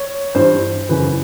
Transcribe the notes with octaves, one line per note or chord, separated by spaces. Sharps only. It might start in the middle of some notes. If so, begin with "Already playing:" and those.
Already playing: C#5
G2 E3 C5
F#2 C#3 E3 B4